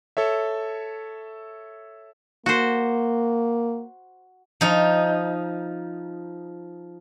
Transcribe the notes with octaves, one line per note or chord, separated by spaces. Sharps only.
A4 C#5 E5
A#3 F#4 C5
F3 D#4